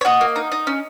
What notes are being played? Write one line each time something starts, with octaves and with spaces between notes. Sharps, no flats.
C#5
F#4 D#5
A#3
D#4
D#4
C#4